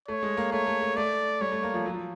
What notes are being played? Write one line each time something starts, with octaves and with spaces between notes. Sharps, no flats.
A3 C#5
G#3
A#3
A3 C#5
A3
A3
A3 D5
G3 C#5
A3
A#3
F3
F#3
F3